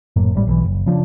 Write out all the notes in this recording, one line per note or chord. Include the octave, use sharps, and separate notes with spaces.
F#1 F#2 A2 A#3
G#1 A2 G3
B1 D3 E3
F#1
C#3 F3 D4